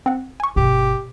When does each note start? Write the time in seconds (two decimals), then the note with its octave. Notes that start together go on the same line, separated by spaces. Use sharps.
0.06 C4 F#5
0.40 G#5 C#6
0.56 G1 B2 G4